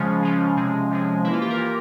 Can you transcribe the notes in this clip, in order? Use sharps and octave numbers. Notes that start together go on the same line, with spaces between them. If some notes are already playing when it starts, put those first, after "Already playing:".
Already playing: C#3 F3 G#3 C#4
C#3 F3 G#3
C3 F3 G#3
C3 F3 G#3
E3 A#3 E4
F4
G4
A#4
E3 A#3